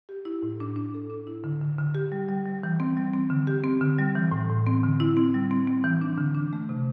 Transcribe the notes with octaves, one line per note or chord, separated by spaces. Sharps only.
G4
E4
A2
D4
D4
A4
D4
E4
D3
D3
D3
G4
G3
G3
G3
E3
C4
G3
C4
D3
G4
C4
D3
G3
E3
A2
A2
C4
D3
E4
C4
G3
C4
C4
E3
D4
D3
D4
A3
C3